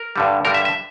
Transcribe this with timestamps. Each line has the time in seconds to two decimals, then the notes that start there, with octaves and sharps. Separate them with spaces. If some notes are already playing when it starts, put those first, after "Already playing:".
Already playing: A#4
0.16 G2 D3 G3
0.45 G2 D3 G3 A#4
0.54 E5
0.65 E5